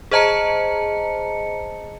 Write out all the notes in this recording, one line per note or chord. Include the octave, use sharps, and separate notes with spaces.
G#4 C5 D#5 A5 A#5 C#7